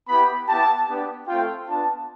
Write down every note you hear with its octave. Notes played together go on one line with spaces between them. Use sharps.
B3 E4 G4 B5
B3 E4 G4 A5
B3 D4 G4
A3 C4 F4 G5
B3 D4 F4 A5